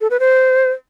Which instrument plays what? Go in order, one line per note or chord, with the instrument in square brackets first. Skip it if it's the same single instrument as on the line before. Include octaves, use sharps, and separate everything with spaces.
[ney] A4
B4
C5